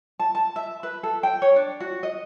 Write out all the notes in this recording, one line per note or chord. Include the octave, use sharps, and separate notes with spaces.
A5
A5
E5
B4
A4
G5
C#5
D4
F#4
D#5